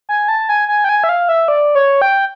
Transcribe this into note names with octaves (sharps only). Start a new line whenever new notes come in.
G#5
A5
G#5
G#5
G5
G#5
E5
F5
E5
D5
C#5
G5